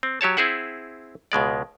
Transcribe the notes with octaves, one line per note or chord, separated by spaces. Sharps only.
C4
F#3 G4 C#5 A5
C4 E4 G#4 E5 F#5
C#2 B2 G#3 D5